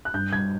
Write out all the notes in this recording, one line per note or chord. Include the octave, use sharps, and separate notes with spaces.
F#6
G2 G6
G2 G#6